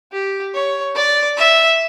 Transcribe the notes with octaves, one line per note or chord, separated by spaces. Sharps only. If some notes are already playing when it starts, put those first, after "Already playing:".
G4
C#5
D5
E5